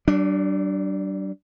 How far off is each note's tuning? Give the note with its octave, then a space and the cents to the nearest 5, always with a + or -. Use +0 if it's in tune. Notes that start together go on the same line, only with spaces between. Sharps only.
G3 -45 D4 +0